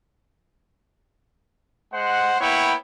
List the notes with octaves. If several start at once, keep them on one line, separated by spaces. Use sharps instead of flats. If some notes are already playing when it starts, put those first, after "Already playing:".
G#3 C5 F#5
A#3 B3 E4 C#5 G5